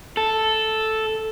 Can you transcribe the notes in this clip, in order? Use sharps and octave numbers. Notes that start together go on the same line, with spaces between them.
A4